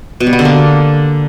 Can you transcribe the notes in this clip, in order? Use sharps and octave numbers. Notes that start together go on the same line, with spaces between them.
B2
G3
B3
D3
A#3